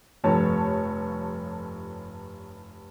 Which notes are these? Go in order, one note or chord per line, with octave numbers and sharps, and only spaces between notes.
F1 G2 F3 A4 C#5 A5